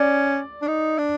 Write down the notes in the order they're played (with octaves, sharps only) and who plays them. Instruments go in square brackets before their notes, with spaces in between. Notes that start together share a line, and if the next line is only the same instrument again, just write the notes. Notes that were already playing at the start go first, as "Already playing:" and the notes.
Already playing: [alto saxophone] C#4 [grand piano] D5
[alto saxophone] D4
D#4
D4